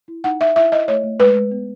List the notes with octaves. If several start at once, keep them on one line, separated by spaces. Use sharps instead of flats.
E4
D#4 F#5
D#4 E5
E4 E5
E4 D#5
A3 C#5
A3
G#3 B4
G#3
B3